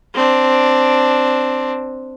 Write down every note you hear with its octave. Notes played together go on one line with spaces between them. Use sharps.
C4 D4